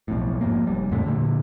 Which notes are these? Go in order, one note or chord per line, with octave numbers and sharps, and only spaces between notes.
B1 F2 A2
F2 G#2 A#3
F1 G3
E2 G#2 C3 A3
A#2 D3